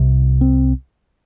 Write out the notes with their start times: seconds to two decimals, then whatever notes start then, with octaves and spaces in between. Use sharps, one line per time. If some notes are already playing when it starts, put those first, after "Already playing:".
Already playing: C2 C3
0.41 C4